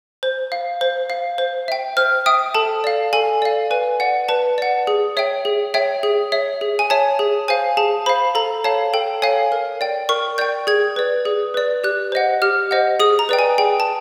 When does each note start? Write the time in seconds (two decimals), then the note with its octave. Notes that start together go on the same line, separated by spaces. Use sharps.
0.23 C5
0.52 F5
0.81 C5
1.10 F5
1.38 C5
1.68 E5 G5
1.97 C5 F6
2.26 E5 G5 D#6
2.54 A4 A5
2.84 D5 F5
3.13 A4 G#5
3.42 D5 F5
3.71 B4 G#5
4.00 D5 F#5
4.28 B4 A5
4.58 D5 F#5
4.87 G#4
5.17 C#5 E5 G5
5.45 G#4
5.74 C#5 E5 G5
6.03 G#4
6.32 C#5 E5
6.61 G#4
6.79 G#5
6.90 C#5 E5 A5
7.19 G#4
7.48 C5 F5 G#5
7.77 G#4 A5
8.06 C5 F5 B5
8.35 A4 A#5
8.64 C#5 F5 A5
8.93 A4 G5
9.22 C#5 F5 G#5
9.52 A#4
9.81 D5 G5
10.09 A#4 C#6
10.38 D5 G5 G6
10.67 G#4 G#6
10.96 B4 D5
11.25 G#4
11.54 B4 D5
11.84 G4 F#6
12.12 C5 D#5 F#5
12.42 G4 F6
12.71 C5 D#5 F#5
13.00 G#4 D#6
13.19 A#5
13.29 B4 D5 G5
13.39 G#5
13.58 G#4 G5
13.80 A5